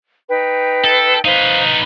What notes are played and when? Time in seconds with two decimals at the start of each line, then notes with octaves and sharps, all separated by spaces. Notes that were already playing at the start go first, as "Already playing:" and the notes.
0.29 D#4 B4 G5
0.84 A4
1.25 D#4 B4 C5 F5